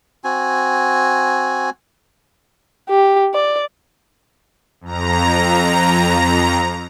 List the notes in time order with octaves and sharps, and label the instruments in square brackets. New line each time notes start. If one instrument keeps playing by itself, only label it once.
[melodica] C4 F#4 G#5
[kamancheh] G4
D5
[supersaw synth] F2 A#5